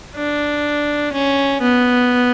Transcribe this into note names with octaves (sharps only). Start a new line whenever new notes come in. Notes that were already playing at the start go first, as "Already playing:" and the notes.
D4
C#4
B3